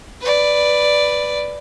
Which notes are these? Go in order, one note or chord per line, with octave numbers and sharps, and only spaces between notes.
B4 D5